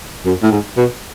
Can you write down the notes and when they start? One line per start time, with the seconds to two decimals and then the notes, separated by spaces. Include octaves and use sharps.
0.26 F#2
0.43 A2
0.51 G#2
0.77 B2